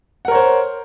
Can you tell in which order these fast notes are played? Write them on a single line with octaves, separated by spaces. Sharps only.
F#5 A#4 C#5 C5